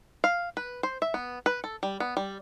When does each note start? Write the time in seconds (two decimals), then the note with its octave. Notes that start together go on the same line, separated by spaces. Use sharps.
0.24 F5
0.57 B4
0.83 C5
1.02 E5
1.14 B3
1.46 B4
1.64 A4
1.83 G3
2.00 B3
2.17 G3